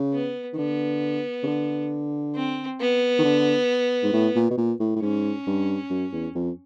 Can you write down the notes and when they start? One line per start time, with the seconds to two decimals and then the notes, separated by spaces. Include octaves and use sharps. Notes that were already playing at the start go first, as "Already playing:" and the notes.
Already playing: C#3
0.14 B3
0.53 D#3
0.58 D3 B3
1.43 C#3
1.47 D3
2.35 C4
2.80 B3
3.19 D#3
3.24 D3
4.03 G#2
4.13 A2
4.36 A#2
4.51 B2
4.58 A#2
4.80 A2
4.96 A2
5.02 G#2 C#4
5.47 G2
5.90 F#2
6.12 E2
6.35 F2